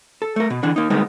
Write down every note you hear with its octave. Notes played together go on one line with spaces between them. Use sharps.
A4
A3 A#4
B2
D3 E3 D4
A#3 D#4
D3 G3 G#3 A#3 B3 D#4